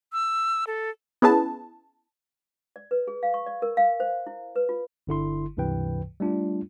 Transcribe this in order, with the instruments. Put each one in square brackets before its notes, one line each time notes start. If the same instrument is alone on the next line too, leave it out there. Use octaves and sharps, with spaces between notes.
[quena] E6
A4
[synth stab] B3 C#4 E4 G#4 B4 A5
[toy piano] D5
B4
G#4
F5
C#6
D5
A#4
F5
C5
E4
B4
F4
[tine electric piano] G1 D3 E4 C6
C#2 G2 C3 E3 B4 G5
G3 A3 D4 F4